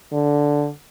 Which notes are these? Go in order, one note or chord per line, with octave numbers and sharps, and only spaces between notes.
D3